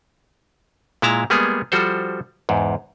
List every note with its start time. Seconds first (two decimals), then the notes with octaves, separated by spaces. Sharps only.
1.02 A#2 G#3 E4 A5 A#5
1.30 G3 G#3 A#3 B3 G#4
1.72 F3 G3 F#4 A4 C5
2.49 E2 G#2